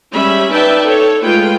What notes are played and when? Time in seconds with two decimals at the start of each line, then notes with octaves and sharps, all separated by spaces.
0.14 G3 G#3 C#4 E5 B5
0.52 D#4 B4 D5 E5 G5 A5
0.86 A4 C#5
1.25 G#3 A3 F4 B4 G5